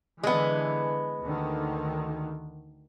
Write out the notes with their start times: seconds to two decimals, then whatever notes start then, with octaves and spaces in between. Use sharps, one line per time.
0.23 D3 E3 G#3 B3
1.22 D2 D3 D#3